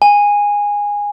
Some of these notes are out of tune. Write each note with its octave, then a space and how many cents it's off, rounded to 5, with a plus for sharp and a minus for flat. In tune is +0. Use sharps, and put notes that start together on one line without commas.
G#5 -15